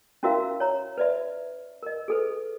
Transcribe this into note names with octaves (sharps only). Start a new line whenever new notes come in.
C#4 E4 F#4 A#4 E5 F5
C#5 A#5
B4 D5 E5
A#4 D#5
G#4 A4 B4